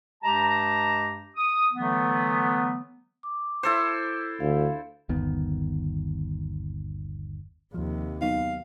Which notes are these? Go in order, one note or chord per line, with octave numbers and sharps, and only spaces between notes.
G2 G#3 G4 D#5 A5 A#5
D#6
D3 E3 F#3 A3 B3
D6
E4 A4 C5
D2 F5
G1 D#2 D#3 B3
D#2 C3 F3
F#3 B3 D#4 F5